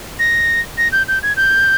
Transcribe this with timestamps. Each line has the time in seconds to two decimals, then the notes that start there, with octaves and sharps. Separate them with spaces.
0.19 A#6
0.78 A#6
0.92 G6
1.08 G6
1.23 G#6
1.36 G6